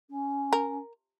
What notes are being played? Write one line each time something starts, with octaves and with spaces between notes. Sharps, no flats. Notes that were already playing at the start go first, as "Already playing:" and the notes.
C#4
A#4